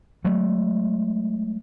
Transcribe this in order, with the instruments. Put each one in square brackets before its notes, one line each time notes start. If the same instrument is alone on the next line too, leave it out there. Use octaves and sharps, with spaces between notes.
[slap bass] F#3 G#3 A3